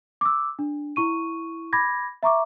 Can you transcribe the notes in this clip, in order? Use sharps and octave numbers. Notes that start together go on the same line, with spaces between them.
D6 E6
D4
E4 C#6 D#7
B5 D6 G#6 A#6
E5 A#5 C#6 D6